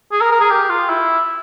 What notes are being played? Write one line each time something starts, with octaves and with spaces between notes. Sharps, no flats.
G#4
A#4
A#4
G#4
G4
F4
E4